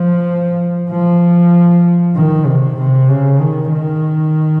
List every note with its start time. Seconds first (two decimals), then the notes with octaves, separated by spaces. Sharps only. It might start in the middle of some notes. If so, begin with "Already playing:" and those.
Already playing: F3
0.91 F3
2.15 D#3
2.46 C3
2.78 C3
3.09 C#3
3.40 D#3
3.71 D#3